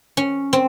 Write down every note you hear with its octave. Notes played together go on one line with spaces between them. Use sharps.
C#4
C4